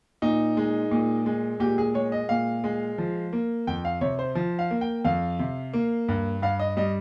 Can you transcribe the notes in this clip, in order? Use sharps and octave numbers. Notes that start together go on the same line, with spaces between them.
A#2 D#4
G#3
A#2
G#3
A#2 G4
G#4
G#3 C#5
D#5
A#2 F5
G#3
F3
A#3
F2 G5
F5
C3 C#5
C5
F3
F5
A#3
G5
F2 F5
C3
A#3
G2
G2 F5
D#5
G3 D#5